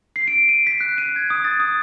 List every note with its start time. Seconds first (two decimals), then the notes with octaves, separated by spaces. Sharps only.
0.16 C7
0.28 D7
0.49 D#7
0.67 B6
0.80 F#6
0.98 D#7
1.16 G#6
1.30 D#6
1.44 A6
1.60 D#6